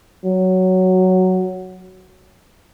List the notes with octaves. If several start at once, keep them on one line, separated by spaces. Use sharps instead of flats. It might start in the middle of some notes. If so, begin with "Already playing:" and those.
F#3